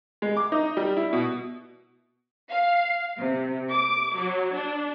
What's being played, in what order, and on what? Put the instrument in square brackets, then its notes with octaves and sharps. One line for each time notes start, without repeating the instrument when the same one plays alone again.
[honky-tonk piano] G#3
D6
D#4
G3
E4
B2
[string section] F5
C3
D6
F#3
D4